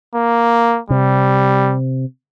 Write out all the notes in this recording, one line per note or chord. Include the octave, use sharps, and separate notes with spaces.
A#3
C3 G3